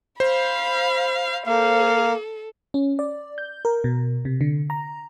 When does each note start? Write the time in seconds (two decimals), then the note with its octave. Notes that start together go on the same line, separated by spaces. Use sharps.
0.20 C5 F5 B5
1.47 A#3 A4 F5
2.74 C#4
2.99 D5
3.38 G6
3.65 A#4
3.84 B2
4.25 C3
4.41 D3
4.70 A#5